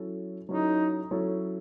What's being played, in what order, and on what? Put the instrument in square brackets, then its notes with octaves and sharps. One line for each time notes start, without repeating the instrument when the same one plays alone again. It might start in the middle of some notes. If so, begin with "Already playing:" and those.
Already playing: [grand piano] F#3 C#4 E4 A4
[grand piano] F#3 C#4 E4 A4 [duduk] D#4
[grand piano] F#3 C#4 E4 A4